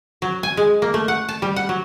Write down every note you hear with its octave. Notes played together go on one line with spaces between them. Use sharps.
F#3
G#5
G#3
A#3
A3
F#5
A5
G3
F#5
F#3